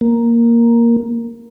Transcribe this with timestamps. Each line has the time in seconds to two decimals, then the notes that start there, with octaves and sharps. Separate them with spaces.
0.01 A#3